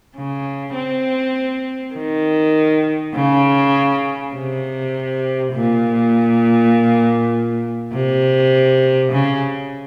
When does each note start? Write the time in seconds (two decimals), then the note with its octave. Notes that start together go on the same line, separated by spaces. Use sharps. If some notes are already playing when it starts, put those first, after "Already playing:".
0.16 C#3
0.75 C4
1.94 D#3
3.14 C#3
4.34 C3
5.53 A#2
7.93 C3
9.11 C#3